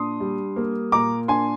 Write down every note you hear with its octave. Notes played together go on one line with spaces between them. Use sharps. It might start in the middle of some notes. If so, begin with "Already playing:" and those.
Already playing: A#2 D4 C6 D#6
G3
A#3
A#2 A#5 D6
D4 G#5 C6